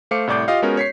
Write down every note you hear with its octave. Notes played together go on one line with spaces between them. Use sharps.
A3 C5 F5 D6 C#7
C2 A2 D5 D6 G6
F4 G4 D#5 F5
G#3 B3 C#4 F#4 A#4
C#5 B6 C7